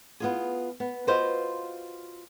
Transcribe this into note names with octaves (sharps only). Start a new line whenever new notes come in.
B3 F4 G#4
B3
F4 F#4 B4 C5 D#5 F5